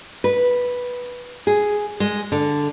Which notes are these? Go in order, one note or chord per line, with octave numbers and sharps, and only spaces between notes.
B4
G#4
G#3
D3